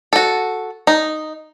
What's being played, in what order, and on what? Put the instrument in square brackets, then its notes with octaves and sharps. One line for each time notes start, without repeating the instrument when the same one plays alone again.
[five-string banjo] F#4 A4
D#4